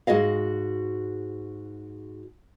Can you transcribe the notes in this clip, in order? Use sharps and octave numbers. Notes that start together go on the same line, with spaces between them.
G#2 F#4 G#4 D#5 F5